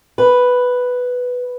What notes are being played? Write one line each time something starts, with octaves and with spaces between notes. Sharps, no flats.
B4